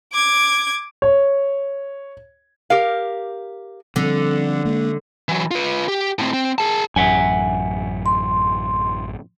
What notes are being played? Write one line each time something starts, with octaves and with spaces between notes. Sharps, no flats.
D6 G#6
C#5
G4 A#4 F5
D3 F3 G3 C4
G#3 A#3
E3 F#3
F4 B4
G4
A2 C4
C4
G#4 A5
A1 F#2 E5 F#5 G#5
C6